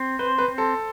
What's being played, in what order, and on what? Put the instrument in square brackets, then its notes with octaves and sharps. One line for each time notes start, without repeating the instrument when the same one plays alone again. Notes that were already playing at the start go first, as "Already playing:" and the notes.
Already playing: [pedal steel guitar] C4
[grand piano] B4 [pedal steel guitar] C5
[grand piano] B4
[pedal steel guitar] C4
[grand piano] A4